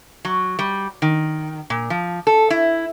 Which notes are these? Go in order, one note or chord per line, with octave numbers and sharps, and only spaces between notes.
F#3
G3
D#3
A#2
F3
A4
E4